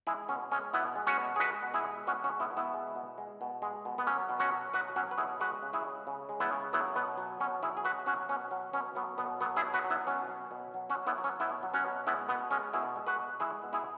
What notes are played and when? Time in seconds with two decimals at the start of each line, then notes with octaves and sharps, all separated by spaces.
0.07 G#3 E4 G#4
0.29 B2 C#4
0.51 G#3 C#4
0.73 B2 B3 E4
0.96 G#3
1.07 C#4 F#4
1.17 B2
1.36 G#4
1.40 G#3 F#4 B4
1.62 B2
1.74 E4 G#4
1.84 G#3
2.07 B2 C#4 F#4
2.24 C#4 F#4
2.29 G#3
2.40 B3 E4
2.51 B2
2.57 B3 E4
2.74 G#3
2.95 B2
3.18 G#3
3.41 B2
3.62 G#3
3.85 B2
3.98 B3
4.07 F#3 C#4
4.29 B2
4.40 C#4 F#4
4.52 F#3
4.74 B2 F#4 B4
4.96 F#3 C#4 F#4
5.11 B4
5.18 B2 E4 G#4
5.40 G#3 F#4 B4
5.63 C#3
5.73 E4 G#4
5.85 G#3
6.07 C#3
6.29 G#3
6.40 B3 E4
6.52 C#3
6.73 F#3 B3 E4
6.95 B2 B3
7.17 F#3
7.40 B2 C#4
7.63 F#3 E4 G#4
7.77 G#4
7.85 B2 F#4 B4
8.06 F#3 C#4 F#4
8.29 B2 C#4
8.51 F#3
8.73 B2 C#4
8.95 F#3 B3
9.18 B2 B3
9.41 F#3 B3
9.56 E4 G#4
9.63 B2
9.74 F#4 B4
9.84 F#3
9.90 B3 E4
10.07 B2 C#4
10.28 F#3
10.51 B2
10.74 F#3
10.90 C#4 F#4
10.95 B2
11.07 B3 E4
11.18 F#3
11.24 C#4
11.40 B2 B3 E4
11.63 F#3
11.74 C#4 F#4
11.85 B2
12.07 G#3 B3 E4
12.28 B2 B3
12.51 G#3 C#4
12.74 B2 E4 G#4
12.96 G#3
13.07 F#4 B4
13.18 B2
13.40 G#3 E4 G#4
13.63 B2
13.73 E4 G#4